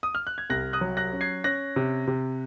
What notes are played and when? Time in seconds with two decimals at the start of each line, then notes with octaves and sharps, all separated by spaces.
0.03 D#6
0.15 F6
0.27 F#6
0.38 G#6
0.50 C2 F#6 A#6
0.73 D#6 F#6
0.81 F#3
0.97 F#6 A#6
1.13 C#4
1.21 G#6 C7
1.44 C#4 F#6 A#6
1.76 C3
2.07 C3